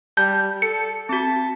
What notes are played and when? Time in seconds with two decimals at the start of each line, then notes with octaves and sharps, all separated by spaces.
0.17 G3 A5 G6
0.62 A4 C#7
1.09 C4 F#4 A5